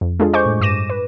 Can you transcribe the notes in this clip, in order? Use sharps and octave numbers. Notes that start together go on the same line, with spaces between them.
F2
G#3 D4 F4 G#4 A4
C5 D#5 G#5 C#6 D6 G6
A2
G2 D6 A#6 D#7 E7
B4